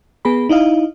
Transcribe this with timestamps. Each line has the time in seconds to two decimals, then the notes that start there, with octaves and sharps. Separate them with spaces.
0.25 B3 G#4 B5
0.49 D#4 E4 D#5 F5